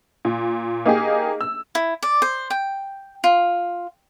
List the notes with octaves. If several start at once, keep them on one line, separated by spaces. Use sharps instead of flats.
A#2
A#3 D#4 G4 G#4
E6
E4
D5
C5
G5
F4